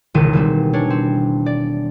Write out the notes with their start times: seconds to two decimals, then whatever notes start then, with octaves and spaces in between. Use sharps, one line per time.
0.14 E1 C#2 D#3 D#7
0.33 B2 G3 C4
0.73 C#4 D4 C#5
0.90 C4
1.46 D5